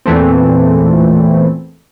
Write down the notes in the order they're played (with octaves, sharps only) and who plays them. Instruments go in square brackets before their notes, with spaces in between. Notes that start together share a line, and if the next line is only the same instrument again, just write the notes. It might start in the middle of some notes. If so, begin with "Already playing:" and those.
[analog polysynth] E2 A#2 E3 A3 C4